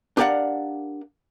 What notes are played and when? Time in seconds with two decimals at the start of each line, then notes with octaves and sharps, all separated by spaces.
0.17 D4 G4 A#4 D5 F5 F#5